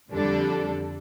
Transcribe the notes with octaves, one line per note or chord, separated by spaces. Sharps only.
F2 D3 G3 D4 A4